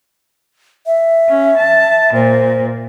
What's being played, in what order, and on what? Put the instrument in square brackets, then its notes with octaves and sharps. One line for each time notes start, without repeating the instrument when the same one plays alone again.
[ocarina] E5
[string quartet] C#4
A5
[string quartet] A#2 [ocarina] C5